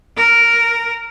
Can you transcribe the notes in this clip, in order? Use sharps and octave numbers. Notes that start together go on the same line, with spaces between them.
A#4